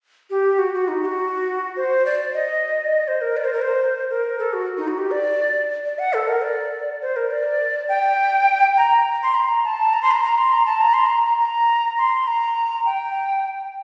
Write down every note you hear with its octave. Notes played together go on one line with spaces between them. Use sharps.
G4
F#4
F#4
D#4
G4
F#4
C5
D5
D#5
D5
D#5
C5
A#4
D5
C5
A#4
C5
A#4
A4
F#4
D#4
F#4
G4
D5
D5
F#5
A4
A#4
D5
C5
A#4
D5
G5
A#5
C6
A#5
A5
A#5
C6
A#5
A#5
C6
A#5
A5
A#5
C6
A#5
A#5
C6
A#5
G5